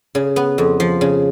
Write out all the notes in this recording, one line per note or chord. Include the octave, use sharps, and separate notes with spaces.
C#3
B3
F2
F3
C#3